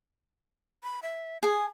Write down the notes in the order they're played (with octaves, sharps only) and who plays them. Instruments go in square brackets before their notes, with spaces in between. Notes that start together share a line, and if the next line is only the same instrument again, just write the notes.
[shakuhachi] B5
E5
[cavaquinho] G#4 G#5 [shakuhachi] D#6